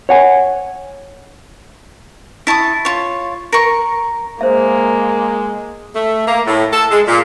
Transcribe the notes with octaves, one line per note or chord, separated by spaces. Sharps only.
C#5 F#5 G#5
E4 A5 C#6 D#6
F4 C#5
A#4 C#6
G#3 A#3 C5 E5
A3
A#3
A2
A4
G#3
A#2